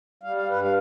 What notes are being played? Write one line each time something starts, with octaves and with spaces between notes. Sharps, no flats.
G3 F5
F5
G2 B4
F5